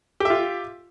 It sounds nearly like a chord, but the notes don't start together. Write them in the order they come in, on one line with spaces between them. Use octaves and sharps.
G4 E5 F4